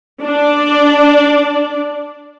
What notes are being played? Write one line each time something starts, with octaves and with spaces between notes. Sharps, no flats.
D4 D5